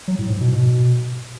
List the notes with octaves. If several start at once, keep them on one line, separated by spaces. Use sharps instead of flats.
F#3
A2
G#2
B2
B2